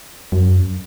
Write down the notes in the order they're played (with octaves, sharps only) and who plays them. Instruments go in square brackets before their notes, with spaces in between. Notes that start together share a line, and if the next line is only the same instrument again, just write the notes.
[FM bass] F#2